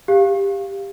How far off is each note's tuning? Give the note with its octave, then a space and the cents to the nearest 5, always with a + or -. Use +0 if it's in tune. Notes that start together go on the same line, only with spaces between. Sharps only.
G4 +15 F5 +0